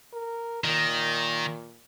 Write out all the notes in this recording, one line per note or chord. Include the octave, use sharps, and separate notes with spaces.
A#4
A#2 D#3